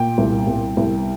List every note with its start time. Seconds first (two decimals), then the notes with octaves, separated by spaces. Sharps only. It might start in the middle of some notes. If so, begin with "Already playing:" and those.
Already playing: A#2 G5
0.18 C2
0.47 C2
0.77 C2